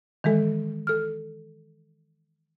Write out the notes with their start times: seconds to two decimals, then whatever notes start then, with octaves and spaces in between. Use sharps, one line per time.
0.24 D#3 E3 G#3 A4
0.87 A4 F6